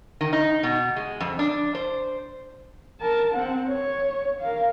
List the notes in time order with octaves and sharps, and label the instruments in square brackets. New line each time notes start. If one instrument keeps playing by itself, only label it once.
[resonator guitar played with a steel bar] D#3
D#4
B2
G#3
F2
D4
C5
[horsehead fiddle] A#4 A5
C4 F#5
C#5
A#4 F5